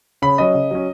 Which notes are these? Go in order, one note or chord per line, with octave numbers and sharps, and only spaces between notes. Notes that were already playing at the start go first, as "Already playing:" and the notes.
C#3 B5
F#3 C#4 D#5
C#3
F#3 C#4